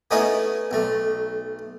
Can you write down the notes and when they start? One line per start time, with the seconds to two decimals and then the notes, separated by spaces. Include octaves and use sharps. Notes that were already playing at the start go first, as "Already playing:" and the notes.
0.11 A3 B3 C#4 D#4 E4 G#4
0.71 B1 A3